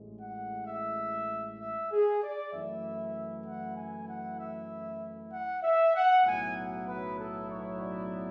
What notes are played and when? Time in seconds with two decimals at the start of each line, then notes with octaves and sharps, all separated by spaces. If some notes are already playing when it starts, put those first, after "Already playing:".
Already playing: A1 A2 G#3
0.20 F#5
0.67 E5
1.60 E5
1.92 G#4
2.23 D5
2.53 F#2 E3 A3 E4 E5
3.45 F#5
3.77 G#5
4.09 F#5
4.39 E5
5.31 F#5
5.63 E5
5.95 F#5
6.25 B1 A2 F#3 B3 E4 G#5
6.56 F#5
6.87 B4
7.18 A4
7.48 C#5
7.80 D5